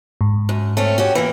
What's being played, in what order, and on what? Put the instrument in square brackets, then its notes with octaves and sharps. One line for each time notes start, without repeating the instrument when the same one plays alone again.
[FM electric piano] G#2
[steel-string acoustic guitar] F#2
A3 C4 C#4
C#4 F#4 G4
E3 A#3